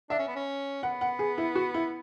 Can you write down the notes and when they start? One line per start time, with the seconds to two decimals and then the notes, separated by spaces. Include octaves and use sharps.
0.10 D4 E5
0.19 C#4
0.28 B3
0.36 C#4
0.83 B3 F#5
1.01 F#5
1.19 G#4
1.38 E4
1.55 F#4
1.74 E4